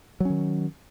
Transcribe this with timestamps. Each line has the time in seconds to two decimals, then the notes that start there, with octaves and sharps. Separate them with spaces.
0.20 F#3
0.25 C#4
0.30 D#3